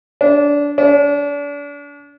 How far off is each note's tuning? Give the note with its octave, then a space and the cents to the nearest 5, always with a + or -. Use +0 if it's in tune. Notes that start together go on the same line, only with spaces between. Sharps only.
D4 -20
D4 -35